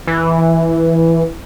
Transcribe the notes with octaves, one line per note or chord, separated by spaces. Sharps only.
E3